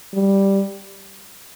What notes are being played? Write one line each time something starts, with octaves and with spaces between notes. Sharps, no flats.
G3